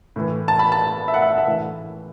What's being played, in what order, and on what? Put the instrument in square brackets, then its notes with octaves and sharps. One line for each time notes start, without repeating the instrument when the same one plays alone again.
[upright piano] A2 E3
A5
B5
A5
E5
F#5
E5
F#5
E5
A2 E3